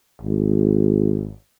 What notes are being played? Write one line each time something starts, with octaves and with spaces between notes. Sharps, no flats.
G#1